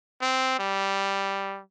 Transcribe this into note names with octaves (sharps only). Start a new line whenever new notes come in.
C4
G3